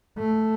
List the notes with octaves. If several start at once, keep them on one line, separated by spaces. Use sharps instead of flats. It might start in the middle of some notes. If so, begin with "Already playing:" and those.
A3